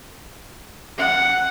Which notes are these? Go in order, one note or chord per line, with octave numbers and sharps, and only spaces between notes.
F#5